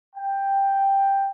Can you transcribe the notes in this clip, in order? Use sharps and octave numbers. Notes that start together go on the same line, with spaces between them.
G5